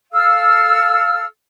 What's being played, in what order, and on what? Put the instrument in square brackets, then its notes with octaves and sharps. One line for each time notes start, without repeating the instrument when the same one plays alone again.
[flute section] A4 F5 E6 F6